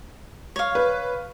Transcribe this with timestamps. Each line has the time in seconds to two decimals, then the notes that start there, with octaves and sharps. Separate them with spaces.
0.56 C#5 F5
0.75 B4